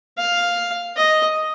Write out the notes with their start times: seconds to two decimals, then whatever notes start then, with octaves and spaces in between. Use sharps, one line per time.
0.18 F5
0.96 D#5